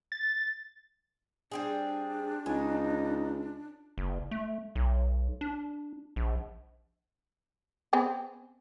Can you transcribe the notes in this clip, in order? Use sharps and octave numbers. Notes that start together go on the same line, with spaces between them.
A6
G3 C4 D4 G#4
C#2 D#4 G#5
F#1
A3
B1
D4
A#1
B3 C4 G#4